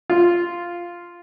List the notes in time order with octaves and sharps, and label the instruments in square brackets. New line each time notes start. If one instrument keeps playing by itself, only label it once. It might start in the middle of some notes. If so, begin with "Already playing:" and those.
[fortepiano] F4